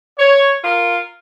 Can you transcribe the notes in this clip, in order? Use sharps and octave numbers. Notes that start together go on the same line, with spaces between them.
C#5
F4 A#4